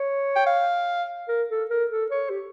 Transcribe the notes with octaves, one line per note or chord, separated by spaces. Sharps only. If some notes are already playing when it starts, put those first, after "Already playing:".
Already playing: C#5
G5
F5
A#4
A4
A#4
A4
C#5
G4